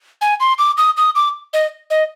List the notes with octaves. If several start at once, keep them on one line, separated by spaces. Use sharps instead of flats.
G#5
C6
D6
D#6
D#6
D6
D#5
D#5